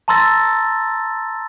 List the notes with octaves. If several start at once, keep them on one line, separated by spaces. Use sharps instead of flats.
A5 A#5 C6 E6 A6 A#6